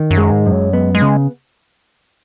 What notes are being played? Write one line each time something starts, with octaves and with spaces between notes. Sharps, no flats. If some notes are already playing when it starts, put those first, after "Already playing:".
Already playing: D#3
F#2
G#3
G#2
F#2
F#3
G#3 B3
G#3
C#3